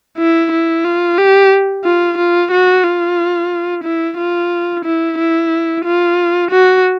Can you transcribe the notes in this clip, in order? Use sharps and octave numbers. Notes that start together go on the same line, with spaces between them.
E4
E4
F4
G4
F4
F4
F#4
F4
E4
F4
E4
E4
F4
F#4